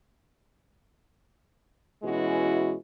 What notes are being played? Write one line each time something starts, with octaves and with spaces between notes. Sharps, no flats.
B2 E3 G#3 C#4 E4 F#4